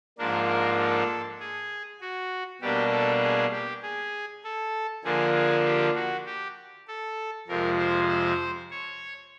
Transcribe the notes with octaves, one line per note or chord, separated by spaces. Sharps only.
G#2 F3 A#3 D4 A#4
A#4
A4
G#4
F#4
B2 G3 A#3 D4 G4
A4
G#4
G4
G#4
A4
D3 F3 A#3 D4 G#4
G#4
G4
F#4
G4
A4
F2 C3 F3 G#3 A#4
C5
C5
C#5